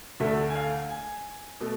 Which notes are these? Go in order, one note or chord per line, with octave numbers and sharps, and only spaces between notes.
D2 D3 A3 E5
G#5
F5
G#5
B2 A3